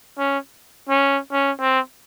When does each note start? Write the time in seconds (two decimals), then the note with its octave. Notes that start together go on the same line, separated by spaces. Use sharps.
0.18 C#4
0.89 C#4
1.32 C#4
1.60 C4